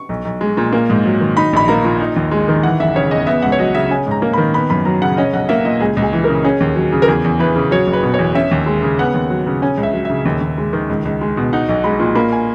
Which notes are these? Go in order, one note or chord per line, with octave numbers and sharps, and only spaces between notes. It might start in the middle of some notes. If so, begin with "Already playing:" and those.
Already playing: C#6
B1
B1
G#3
A#2
A#3
G#2
F#3
D#3
D#4 B5
A#1 B5
A#3 A#5
A#2
D#4
D#2
G#3
D#3
E3 F#5
F#1 E5
C#3 C#5
E2 D#5
B3 E5
C#2 F#5
C#5
F#3 D#5
C#3 E5
C#4 G#5
G#2 A#5
A#3
D#3 B5
B3 B5
F#2 B5
F#3 A#5
C#3 F#5
C#4 D#5
B1 F#5
A#3 E5
A#2 D#5
C#2 G#4
C#2
G#4
E3
C#3 A#4
C#4 G#4
D#2
F#3
C#3
A#4
E2 G#4
E2
E3 B4
C#3
F#3 C#5
F#1
B4
B2
E2 C#5
C#4 E5
D#2
G#3
C#3
B3 F#5
D#2
F#3
C#3
C#4 G#5
C#2
E5
F#3
C#3 E5
D#2
D#2
G#3
D#3
C#2
C#2
G#3
B2
D#4 F#5
B1
G#3 B5
A#2
A#3 B5
G#5